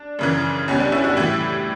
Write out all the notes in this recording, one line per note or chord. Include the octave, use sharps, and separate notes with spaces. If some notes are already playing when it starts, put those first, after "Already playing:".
Already playing: D4
F#2 C#3 E3
C#2 B2 G3 C#4
D4
C#4 E4
D4 F#4
A2 E3 G3 E4 G4